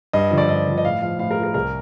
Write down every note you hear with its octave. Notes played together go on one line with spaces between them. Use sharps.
G2 D#5
D3 F3
D5
G2 D#5
D3 F3
D#5
A2 F5
F3 F5
A2 F5
A#4
F3
A#4
C2 A#4